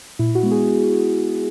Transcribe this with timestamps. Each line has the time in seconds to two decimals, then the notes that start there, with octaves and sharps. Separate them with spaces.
0.19 A#2 E4
0.35 F#4
0.43 G#3 B3
0.51 G#4